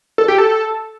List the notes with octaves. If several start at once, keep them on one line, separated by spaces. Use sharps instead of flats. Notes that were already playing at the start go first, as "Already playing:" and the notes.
A4
G4
A4